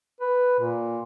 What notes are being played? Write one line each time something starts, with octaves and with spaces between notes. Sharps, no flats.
B4
A#2